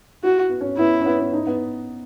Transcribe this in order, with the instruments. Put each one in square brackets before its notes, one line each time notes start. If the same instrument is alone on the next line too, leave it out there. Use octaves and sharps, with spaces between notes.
[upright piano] E4 [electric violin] F#4
[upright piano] B3
C#4
[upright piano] B3 [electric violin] E4
[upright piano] C#4
B3
B3
D#4
B3